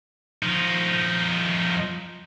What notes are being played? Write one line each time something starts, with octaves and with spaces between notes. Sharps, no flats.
F3 D#4